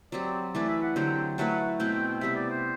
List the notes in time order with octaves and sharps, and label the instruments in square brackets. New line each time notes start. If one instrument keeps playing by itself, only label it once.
[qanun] F#3 C4 G4 [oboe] D5
[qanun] E3 A3 E4 B4 [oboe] D5
[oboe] E5
F#5
[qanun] D3 F#3 C4 G4 [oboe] G5
[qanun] F#3 A3 E4 B4 [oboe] F#5
[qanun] B2 A3 C4 E4 [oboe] G5
[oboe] G5
G5
[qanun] C3 G3 B3 [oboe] E5
[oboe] D5
C5